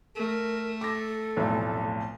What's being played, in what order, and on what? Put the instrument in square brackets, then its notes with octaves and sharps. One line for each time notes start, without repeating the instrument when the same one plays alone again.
[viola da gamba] A3 [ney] A#4
[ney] A4 [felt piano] D6 A#6
[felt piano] F1 B1 A2